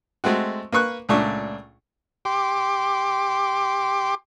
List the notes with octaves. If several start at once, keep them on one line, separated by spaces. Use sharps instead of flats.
G#3 A3 C4 F#4
A#3 B4 C#6 F#6
C#2 A#2 A3 D4 C#6
G4 C6 D6